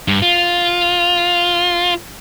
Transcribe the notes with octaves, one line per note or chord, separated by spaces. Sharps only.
G2
F4